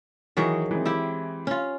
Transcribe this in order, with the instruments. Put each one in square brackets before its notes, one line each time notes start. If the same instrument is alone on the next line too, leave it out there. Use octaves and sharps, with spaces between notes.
[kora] D#3 F#3 G#4 [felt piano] E3 C#6 B6
[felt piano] E3 G#3 C4
[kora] E4 G4
C#4 F4